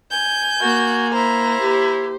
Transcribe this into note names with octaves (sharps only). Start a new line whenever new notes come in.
G#5 G6
A#3 F#4
E4 C5 A#5
G4